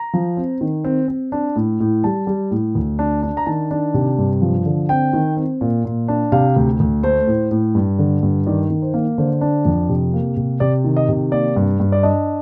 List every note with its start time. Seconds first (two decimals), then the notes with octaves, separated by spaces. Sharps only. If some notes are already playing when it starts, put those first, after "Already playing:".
Already playing: A#5
0.13 F3
0.37 C4
0.61 D#3
0.84 C4
1.08 C4
1.32 D4
1.56 A2
1.80 A2
2.04 G3 A5
2.27 G3
2.51 A2
2.75 D2
2.99 D4
3.23 D4
3.37 A#5
3.46 D#3 A5
3.71 D4
3.94 C3
4.18 G2
4.42 F3
4.66 D3
4.89 C4 G5
5.13 D#3
5.37 C4
5.61 A#2
5.85 A#2
6.08 D4
6.32 C3 F5
6.56 D2
6.80 D2
7.03 A3 C5
7.27 A2
7.51 A2
7.75 G2
7.99 D3
8.23 G2
8.47 D#3 D5
8.70 D#3
8.82 C5
8.94 A#3
9.18 D3 C5
9.41 D4
9.65 F2
9.89 C3
10.13 A#3
10.37 C3
10.60 C3 D5
10.84 D#3
10.96 D#5
11.09 C3
11.32 A#3 D5
11.56 G2
11.80 G2
11.92 D5
12.03 D4 D#5